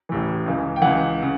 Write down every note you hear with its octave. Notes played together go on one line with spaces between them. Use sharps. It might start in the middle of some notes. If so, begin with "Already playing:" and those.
A1 A2 E3
C#2 C#3 E3
G5
C#2 C#3 E3 F#5
C#3